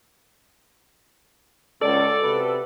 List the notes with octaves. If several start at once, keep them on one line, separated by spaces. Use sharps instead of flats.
C#2 A4 D5
C3 F#4 B4